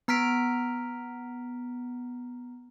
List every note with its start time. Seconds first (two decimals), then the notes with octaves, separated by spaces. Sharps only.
0.08 B3 A#5 F6 B6 D7